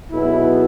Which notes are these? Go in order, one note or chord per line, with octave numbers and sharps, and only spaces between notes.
B1 B2 G#3 B3 E4